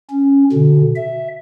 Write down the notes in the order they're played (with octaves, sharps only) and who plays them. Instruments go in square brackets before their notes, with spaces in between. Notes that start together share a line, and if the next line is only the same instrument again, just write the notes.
[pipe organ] C#4
B2 D3
E5